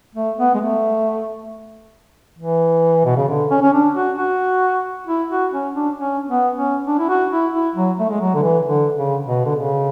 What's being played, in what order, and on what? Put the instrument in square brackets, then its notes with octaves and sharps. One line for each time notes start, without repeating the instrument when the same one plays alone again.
[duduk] A3
B3
G#3
A3
E3
B2
C#3
D3
C#4
C#4
D4
F#4
F#4
E4
F#4
C#4
D4
C#4
B3
C#4
D4
E4
F#4
E4
E4
F#3
A3
G#3
F#3
D3
E3
D3
C#3
B2
D3
C#3